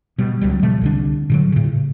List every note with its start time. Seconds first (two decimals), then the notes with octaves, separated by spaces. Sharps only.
0.18 B2 G3
0.41 C#2 F#3 G3
0.63 B2 F3 G3 A3
0.81 C2 D3 D4
1.30 A#2 D3 F#3
1.52 A2 C#3